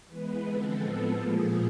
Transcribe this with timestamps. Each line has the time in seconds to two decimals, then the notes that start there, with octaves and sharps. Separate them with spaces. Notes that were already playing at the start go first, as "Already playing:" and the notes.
0.08 E3 G#3 B3 B4
0.43 D3 F3 G#3 C4 A4
0.78 A2 F3 G#3 B3
1.13 A#2 F3 A#3 G#4